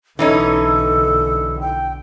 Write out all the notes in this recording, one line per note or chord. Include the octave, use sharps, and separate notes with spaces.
B1 D3 E3 C#4 D#4 A4
G5